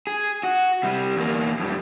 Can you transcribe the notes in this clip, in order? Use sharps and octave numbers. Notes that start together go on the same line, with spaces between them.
G#4
F#4
C3 G3
E2 A#3
F2 G3